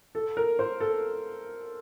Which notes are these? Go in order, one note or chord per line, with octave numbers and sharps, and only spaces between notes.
A4
A#4
C5
A4